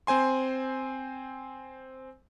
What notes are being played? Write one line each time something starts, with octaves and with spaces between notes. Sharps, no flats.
C4 C5 G#5 C6